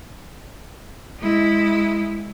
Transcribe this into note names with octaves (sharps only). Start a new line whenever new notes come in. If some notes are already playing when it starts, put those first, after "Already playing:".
G#3 E4